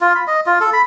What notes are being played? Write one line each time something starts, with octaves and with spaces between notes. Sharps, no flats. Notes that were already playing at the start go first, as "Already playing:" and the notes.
F4
B5
D#5
F4
A4
B5